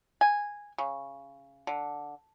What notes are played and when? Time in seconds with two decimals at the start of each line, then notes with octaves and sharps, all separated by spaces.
0.21 G#5
0.78 C#3
1.67 D3